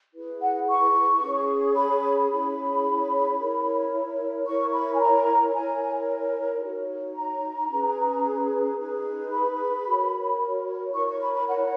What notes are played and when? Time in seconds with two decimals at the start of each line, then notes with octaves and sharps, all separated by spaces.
0.14 E4 G#4 B4
0.41 F#5
0.68 C#6
1.23 C#4 G#4 C#5
1.76 B5
2.31 C#4 E4 G#4 C#5 B5
3.38 E4 A#4 C#5
4.47 E4 A#4 C#5 C#6
4.74 B5
4.94 G#5
5.00 A#5
5.54 E4 A#4 C#5 G#5
6.62 D#4 F#4 C#5
7.16 A#5
7.70 C#4 G#4 B4
8.78 D#4 G#4 B4
9.32 B5
9.86 F#4 A#4 C#5
10.94 E4 A#4 C#5 C#6
11.08 C#6
11.21 B5
11.34 B5
11.48 F#5